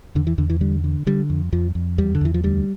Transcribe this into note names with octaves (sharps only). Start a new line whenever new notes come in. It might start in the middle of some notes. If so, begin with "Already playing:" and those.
E2 D3
E3
E2 D3
E3
D3 G3
D3
D3 G3
F2
F2 F3
F2
E2 G3
D3
E2 E3
F3
D2 G3